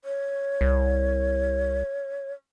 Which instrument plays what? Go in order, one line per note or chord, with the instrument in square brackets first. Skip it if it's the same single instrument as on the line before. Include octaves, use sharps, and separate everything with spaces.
[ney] C#5
[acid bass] C2